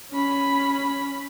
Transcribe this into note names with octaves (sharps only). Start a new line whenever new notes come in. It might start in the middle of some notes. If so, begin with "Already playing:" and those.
C#4 B5